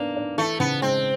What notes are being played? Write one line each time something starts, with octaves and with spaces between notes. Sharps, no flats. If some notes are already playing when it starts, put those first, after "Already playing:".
Already playing: A#3 B3 D4
D4
E3 A3
C#3 B3
G#3 C4